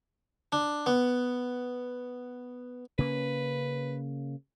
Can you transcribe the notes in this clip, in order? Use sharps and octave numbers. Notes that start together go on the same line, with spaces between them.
D4
B3
C#3 A#3 C#4 B4